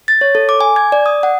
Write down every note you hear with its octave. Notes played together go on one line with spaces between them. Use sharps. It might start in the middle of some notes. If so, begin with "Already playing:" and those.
A6
C#5
A4
D6
G#5
G#6
D5
D#6
F#5